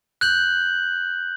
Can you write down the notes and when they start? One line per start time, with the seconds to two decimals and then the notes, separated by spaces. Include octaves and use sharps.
0.21 F#6 G6 F#7